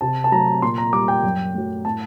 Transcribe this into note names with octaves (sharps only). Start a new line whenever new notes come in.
C3 A5
A5
F#3 A3 A#5
A#2 C6
A#5
G3 D6
G5
F#2
F#3 A3
A2 A5